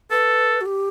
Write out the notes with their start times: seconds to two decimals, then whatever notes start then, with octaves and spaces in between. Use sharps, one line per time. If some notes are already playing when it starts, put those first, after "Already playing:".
0.11 A4 B4
0.61 F#4
0.66 G4